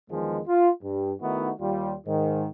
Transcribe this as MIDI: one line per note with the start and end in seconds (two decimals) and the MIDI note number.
0.10 0.40 40
0.10 0.40 51
0.10 0.40 53
0.10 0.40 56
0.47 0.69 65
0.83 1.13 43
1.22 1.52 51
1.22 1.52 57
1.22 1.52 59
1.22 1.52 63
1.22 1.52 64
1.22 1.52 66
1.60 1.96 39
1.60 1.96 55
1.60 1.96 65
2.07 2.47 44
2.07 2.47 51